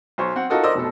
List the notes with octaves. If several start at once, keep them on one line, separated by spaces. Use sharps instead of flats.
B1 C5 C#5
C4 F#5
D#4 F4 F#4 A4 A#4 D#5
A#4 C5 D5 D#5 E6
F1 B2 A4